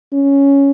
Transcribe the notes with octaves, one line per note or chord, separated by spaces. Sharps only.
C#4